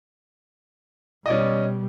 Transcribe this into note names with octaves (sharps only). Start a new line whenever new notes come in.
B2 G3 C#4 D5 D#5